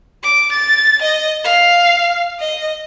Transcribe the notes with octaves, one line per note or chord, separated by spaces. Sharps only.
D6
A6
D#5
F5
D#5